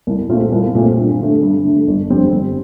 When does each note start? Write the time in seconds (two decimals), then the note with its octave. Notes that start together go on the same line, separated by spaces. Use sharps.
0.07 C2
0.29 A#2 A3 C4 F4
0.52 C2
0.75 A#2 A3 C4 F4
0.97 G2
1.20 D3 A3
1.42 G2
1.65 D3 A3
1.87 G1
2.10 F2 D3 G3 C4
2.33 G1